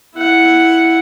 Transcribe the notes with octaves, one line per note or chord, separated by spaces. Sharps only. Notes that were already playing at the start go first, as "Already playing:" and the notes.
E4 F#5